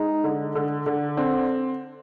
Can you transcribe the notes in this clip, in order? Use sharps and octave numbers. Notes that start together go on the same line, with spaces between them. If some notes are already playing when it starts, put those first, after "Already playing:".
Already playing: G#3 D#4
D3
D3
D3
C4 D4